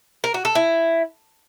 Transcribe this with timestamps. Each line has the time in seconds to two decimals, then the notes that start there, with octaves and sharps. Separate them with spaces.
0.24 A#4
0.34 F#4
0.45 A4
0.55 E4